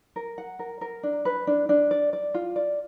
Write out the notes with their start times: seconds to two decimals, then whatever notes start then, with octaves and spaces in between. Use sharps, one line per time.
0.16 A#4
0.38 F#5
0.59 A#4
0.81 A#4
1.03 D4
1.25 B4
1.47 D4
1.69 D4
1.91 D5
2.13 D5
2.34 F4
2.56 D5